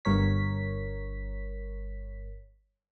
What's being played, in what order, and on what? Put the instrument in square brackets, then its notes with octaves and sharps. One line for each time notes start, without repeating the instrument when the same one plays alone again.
[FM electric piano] G1 G2 A#4 C#5 B6